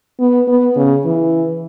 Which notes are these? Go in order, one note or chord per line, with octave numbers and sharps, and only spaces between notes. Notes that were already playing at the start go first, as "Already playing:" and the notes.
B3
B3
C#3
E3